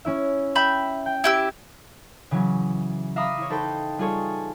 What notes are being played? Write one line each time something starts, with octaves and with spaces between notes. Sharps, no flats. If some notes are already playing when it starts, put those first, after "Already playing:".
C#4 E4 E5
E5 G5 B5 E6 G6
G5
E4 G4 E6
C#3 E3 F#3 C#4
E5 F5 A#5 B5 D6 D#6
E4 C#5
D#4 A4 B4 C5 G5
G3 F4 G#4 A4 C#5